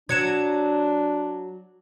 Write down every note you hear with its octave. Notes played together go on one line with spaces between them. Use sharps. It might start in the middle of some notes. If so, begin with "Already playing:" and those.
F#3 D4 G#6 C#7 E7